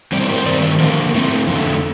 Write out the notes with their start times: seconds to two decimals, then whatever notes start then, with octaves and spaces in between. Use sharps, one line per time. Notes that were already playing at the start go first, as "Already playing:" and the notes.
0.12 A2 G3 C4 D5
0.21 C5
0.29 A#4
0.37 C5
0.46 G2 D#3 A3 C4 D5
0.80 D3 F3 A#3 A#4
1.14 A2 A3 C4
1.47 F2 D3 A3